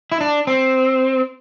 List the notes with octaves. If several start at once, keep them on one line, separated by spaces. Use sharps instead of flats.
E4
D4
C4